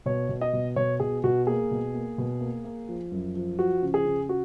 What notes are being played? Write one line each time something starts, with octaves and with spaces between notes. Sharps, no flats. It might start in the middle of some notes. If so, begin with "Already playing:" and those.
B2 C#5
B2
D#5
B2
B2 C#5
B2 G#4
B2 F#4
A#3 G#4
B2
A#3
B2
A#3
A#3
F3
F#2
F3
F3 F#4
C#3
G#4
C#3
F#4